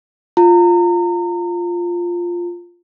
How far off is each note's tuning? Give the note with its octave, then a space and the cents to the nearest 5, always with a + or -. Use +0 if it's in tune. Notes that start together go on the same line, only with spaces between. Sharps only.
F4 +0 A#5 -30